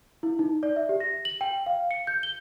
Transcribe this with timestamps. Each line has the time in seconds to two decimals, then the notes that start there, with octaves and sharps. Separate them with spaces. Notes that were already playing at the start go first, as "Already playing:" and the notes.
0.23 E4
0.39 D#4
0.63 D5
0.76 E5
0.89 G4
1.00 A#6
1.25 F#7
1.41 G5
1.66 F5
1.91 C#7
2.07 G6
2.23 G7